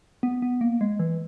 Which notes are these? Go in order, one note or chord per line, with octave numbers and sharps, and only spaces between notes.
B3
B3
A#3
G#3
E3